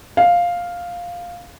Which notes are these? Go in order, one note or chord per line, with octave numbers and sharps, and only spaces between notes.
F5